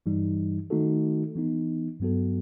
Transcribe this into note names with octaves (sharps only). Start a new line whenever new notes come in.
G2 E3 G3 D#4
D#3 A3 D#4 F#4 A4
E3 B3 D#4
G2 F#3 B3 F#4 A4